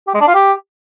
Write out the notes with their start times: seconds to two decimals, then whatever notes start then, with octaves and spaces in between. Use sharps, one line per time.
0.07 G4
0.14 G#3
0.21 D4
0.28 F4
0.35 G4